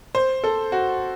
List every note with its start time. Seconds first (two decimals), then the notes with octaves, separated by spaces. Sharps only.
0.15 C5
0.44 A4
0.72 F#4